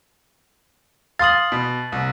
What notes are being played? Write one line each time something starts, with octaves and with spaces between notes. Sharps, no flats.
F5 C6 D#6 A6 F#7
B2
C2